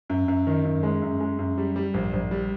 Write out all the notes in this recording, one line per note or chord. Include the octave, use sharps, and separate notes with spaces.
F#2
F#2
D#3
F#2
G#3
F#2
G#3
F#2
G3
G3
A#1
A#1
G3